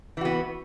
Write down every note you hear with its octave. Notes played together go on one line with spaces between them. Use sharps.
E3 B3 F#4